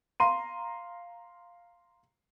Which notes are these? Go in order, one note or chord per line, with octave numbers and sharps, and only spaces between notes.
F5 A#5 C6 D#7